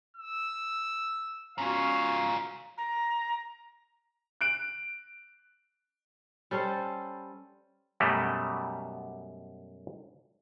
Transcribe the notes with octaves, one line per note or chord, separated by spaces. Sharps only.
E6
G#2 C#4 F4 F#4 F5
A#5
F#6 D7
G3 C#4 A4 C5
F#2 B2 F#3 G3 A3